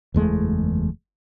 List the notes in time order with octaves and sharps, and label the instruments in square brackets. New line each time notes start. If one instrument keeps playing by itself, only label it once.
[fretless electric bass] F#1 E2 G#3 A3